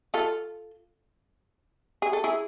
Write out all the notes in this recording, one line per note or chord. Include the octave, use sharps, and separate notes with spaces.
F4 A4
G#4
A4
E4 G#4